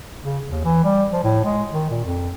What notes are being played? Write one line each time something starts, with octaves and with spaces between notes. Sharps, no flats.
C#3
D#2
E3
G3
F3
A2
G#3
D#3
A#2
F2